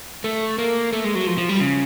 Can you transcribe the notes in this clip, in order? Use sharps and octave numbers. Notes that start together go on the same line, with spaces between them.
A3
A#3
A3
G#3
F#3
F3
F3
G3
C#3